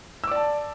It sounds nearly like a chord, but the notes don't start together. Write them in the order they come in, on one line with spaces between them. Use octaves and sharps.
E6 D6 D5 A5